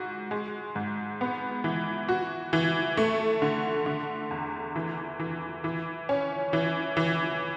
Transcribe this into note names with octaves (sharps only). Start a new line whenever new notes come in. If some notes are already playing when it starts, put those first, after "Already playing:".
Already playing: G#2 F#4
G#3
G#2
B3
E3
F#4
E3
A3
D3
D3
E2
E3
E3
E3
C#4
E3
E3